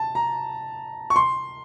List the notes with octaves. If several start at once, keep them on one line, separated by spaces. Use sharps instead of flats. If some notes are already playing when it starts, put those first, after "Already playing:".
Already playing: A5
A#5
C#6
C6